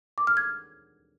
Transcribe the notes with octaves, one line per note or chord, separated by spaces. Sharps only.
D6
F6
G#6